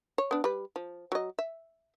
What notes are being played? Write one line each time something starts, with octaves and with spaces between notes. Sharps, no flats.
C#5
B3 D4
G3 B4
F3
F#3 D#5
E5